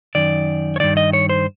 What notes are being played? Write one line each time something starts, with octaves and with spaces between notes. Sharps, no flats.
F#2 D#3 D5
C#5
G2 D#3 D5
D#5
C#5
C5